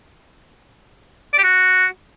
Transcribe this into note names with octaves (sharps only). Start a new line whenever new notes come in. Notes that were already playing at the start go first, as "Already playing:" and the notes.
D5
G4
F#4